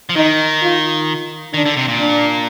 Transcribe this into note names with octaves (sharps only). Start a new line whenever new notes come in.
F3
D#3 D#4
F4
D#3 D4
D3
C3
A#2
D4